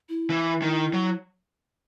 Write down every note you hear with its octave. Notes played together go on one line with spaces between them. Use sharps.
E4
E3
D#3
F#3